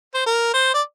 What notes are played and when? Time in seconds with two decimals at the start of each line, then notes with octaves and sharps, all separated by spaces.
0.14 C5
0.26 A#4
0.54 C5
0.74 D5